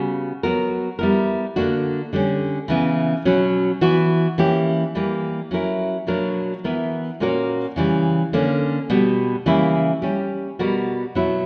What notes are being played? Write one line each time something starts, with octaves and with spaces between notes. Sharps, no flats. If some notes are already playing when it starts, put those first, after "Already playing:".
Already playing: C#3 G3 B3 F#4
F#3 B3 F#4 A#4
G3 B3 E4 A#4
D3 A#3 D4 F#4
D3 G3 C#4
C#3 E3 B3
B2 F#3 C#4
E3 B3 F#4
E3 A#3 C#4 G4
E3 G3 A#3
F#3 C#4 E4 A#4
B2 F#3 A#3 D4 A#4
E3 B3 E4 A#4
A#2 A#3 C#4 F#4 A#4
C#3 E3 G3
D3 A#3 C#4
B2 G3 B3
C#3 E3 G3 A#3 E4
G3 C#4 G4
B2 G3 B3 F#4 A#4
B2 F#3 B3 E4